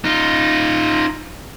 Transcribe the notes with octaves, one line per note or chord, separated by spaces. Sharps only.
D#4 F4